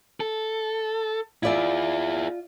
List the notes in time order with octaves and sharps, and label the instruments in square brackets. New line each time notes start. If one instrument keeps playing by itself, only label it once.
[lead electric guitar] A4
[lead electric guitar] E4 G#4 [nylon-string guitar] F4 D5 E5